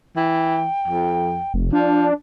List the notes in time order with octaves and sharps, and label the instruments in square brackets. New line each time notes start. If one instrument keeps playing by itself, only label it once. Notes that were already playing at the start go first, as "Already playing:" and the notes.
[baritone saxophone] E3 [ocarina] G5
[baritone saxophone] F2
[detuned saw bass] F1
[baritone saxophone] F3 [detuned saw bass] D4